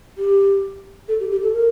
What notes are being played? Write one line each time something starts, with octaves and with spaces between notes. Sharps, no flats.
G4
A4
G4
G4
A4
A#4